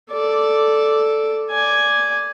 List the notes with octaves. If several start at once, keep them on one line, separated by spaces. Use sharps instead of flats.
A4 D5
D5 G#5